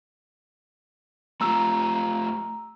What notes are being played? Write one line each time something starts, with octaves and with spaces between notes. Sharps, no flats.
A3 F4 G4 A#5 E6